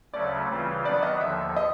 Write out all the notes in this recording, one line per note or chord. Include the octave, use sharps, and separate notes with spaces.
D2 C#3 F#3 A3 C#4 D5
C#3 E3 G3 C4 F4
D#3 F#3 B3 D4 D5
D#5
D#2 D3 F3 E5
D#5